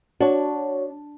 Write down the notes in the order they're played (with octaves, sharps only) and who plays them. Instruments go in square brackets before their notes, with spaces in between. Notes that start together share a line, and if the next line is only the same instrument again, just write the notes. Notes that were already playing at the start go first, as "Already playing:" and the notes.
[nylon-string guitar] D4 [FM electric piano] F#4 C#5